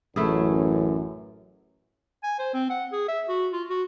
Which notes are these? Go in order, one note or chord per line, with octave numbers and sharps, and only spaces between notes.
A1 F#2 A3 E4 G#4
G#5
C5
C4
F#5
G#4
E5
F#4
F4
F#4